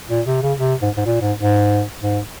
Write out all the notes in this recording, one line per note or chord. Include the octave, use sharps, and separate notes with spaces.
A#2
C3
C#3
C3
G#2
G#2
A#2
G#2
G#2
G#2